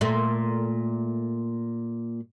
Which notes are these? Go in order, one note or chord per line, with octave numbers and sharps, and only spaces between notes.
A#2 A3